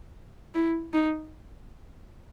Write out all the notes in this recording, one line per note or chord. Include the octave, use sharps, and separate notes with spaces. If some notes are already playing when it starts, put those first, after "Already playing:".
E4
D#4